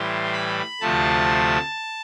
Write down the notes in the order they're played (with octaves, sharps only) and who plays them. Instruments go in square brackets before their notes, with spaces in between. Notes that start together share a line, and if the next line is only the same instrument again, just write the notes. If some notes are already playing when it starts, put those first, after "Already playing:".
Already playing: [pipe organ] A2 E3 G3 C6
B5
D2 C3 F3 A3 A5